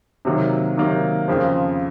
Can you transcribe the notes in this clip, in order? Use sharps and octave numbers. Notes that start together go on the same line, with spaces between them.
C3 D#3 F#3 A#3
C3 D#3 F#3 A#3
F2 C#3 F3